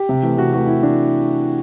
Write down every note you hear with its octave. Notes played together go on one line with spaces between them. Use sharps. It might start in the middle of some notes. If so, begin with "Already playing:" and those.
Already playing: G4
C3
E3 A3
C3 F#4
E3 A3 F#4
C3 E4
E3 A3 D4